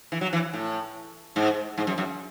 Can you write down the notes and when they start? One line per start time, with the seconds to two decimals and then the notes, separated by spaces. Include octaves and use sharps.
0.12 E3
0.21 F#3
0.33 E3
0.53 A2
1.36 G#2
1.78 G#2
1.87 F#2
1.98 F#2